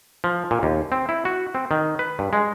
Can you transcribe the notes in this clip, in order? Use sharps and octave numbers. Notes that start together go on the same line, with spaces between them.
F3
A#2
D#2
C4
E4
F#4
C4
D#3
B4
G2
G#3